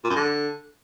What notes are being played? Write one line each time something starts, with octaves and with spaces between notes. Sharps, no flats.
A#2
F#2
D3